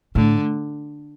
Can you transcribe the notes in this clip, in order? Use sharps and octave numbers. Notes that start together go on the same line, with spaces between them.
A2 D3